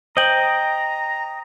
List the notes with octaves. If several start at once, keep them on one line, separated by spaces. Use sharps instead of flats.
C5 D#5 G5 A#5 G6 F#7